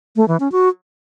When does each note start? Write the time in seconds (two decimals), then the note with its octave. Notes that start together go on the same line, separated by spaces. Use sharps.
0.16 A3
0.28 E3
0.40 C#4
0.52 F#4